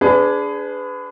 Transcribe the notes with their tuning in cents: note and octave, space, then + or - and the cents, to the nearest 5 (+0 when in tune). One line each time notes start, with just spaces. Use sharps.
D4 -15 G#4 +0 B4 +30